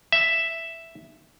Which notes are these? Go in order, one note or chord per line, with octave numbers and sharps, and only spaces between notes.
E5